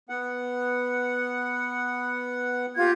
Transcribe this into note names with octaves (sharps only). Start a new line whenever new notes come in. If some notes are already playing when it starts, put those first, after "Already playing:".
B3 F#5
A#3 F4 G4 G#6